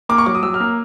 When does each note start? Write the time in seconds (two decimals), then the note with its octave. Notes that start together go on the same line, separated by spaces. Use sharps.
0.09 A#3 D6
0.18 C#6
0.26 F#3 D6
0.35 D#6
0.43 F#3 E6
0.54 F6
0.60 A#3